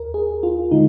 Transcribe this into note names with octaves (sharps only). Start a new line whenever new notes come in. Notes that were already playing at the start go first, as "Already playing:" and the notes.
Already playing: D#2 A#4
G#4
F4
D3 G#3 D#4